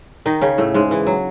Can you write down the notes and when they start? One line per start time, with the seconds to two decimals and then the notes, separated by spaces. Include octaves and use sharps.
0.26 D#3 D#4
0.42 C#3 C#4
0.58 A2 A3
0.74 G#2 G#3
0.91 E3
1.07 F#3